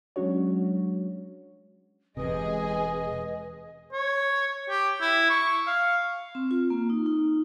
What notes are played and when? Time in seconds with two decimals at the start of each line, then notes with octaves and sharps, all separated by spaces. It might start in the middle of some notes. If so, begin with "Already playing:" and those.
0.16 F#3 G#3 C#4 D4 F#4 C#5
2.17 E1 C3 G#3 G#4 B4 D#5
3.92 C#5
4.69 G4
5.01 E4
5.30 C#6
5.67 F5
6.35 C4
6.51 F4
6.70 A#3
6.90 D#4
7.06 D#4